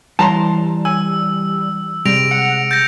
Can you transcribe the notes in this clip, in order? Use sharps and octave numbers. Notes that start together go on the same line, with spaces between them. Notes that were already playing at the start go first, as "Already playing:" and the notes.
E3 G3 A5 A#5 C6
G#5 E6
C3 G3 G#3 A#6 D7 F7
F#5 C#7
G6 A6 A#6